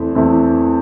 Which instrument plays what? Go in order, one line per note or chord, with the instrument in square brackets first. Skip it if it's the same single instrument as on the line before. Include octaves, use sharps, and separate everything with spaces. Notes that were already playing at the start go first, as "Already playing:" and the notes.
Already playing: [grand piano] E2 E3 A3 C4 E4
E2 E3 A3 C4 E4